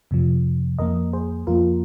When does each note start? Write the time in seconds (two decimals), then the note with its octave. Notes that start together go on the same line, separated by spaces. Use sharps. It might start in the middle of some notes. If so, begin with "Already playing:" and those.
0.11 F2 C3 F3
0.79 F2 F3 A#3 A#4 D#5
1.13 G#4 C5
1.47 F2 F3 A#3 F4 A#4